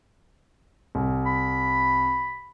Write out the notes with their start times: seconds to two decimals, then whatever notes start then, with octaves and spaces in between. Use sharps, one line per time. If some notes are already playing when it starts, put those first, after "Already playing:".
0.95 C2
1.26 B5